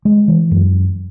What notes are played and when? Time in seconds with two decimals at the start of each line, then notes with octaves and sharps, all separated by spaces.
0.05 G#3
0.28 E3
0.51 F#2